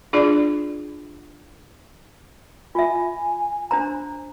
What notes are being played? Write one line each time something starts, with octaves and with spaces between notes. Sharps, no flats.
D4 F4 G#4 D5
F4 E5 G#5
D4 C5 A#5